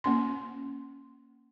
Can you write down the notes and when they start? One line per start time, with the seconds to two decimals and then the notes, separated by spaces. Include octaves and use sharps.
0.04 A#3 C#4 C6